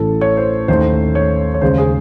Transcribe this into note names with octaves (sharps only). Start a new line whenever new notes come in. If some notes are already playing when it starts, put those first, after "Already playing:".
Already playing: A1 A2 E3 A4
C#5
C5
D#2 D#3 A3 C5
C#5
C#5
D#2 C#3 G#3 C5
G#4